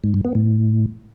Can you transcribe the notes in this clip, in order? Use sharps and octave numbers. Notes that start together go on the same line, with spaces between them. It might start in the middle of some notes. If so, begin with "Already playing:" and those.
G#2
G2
B3
A2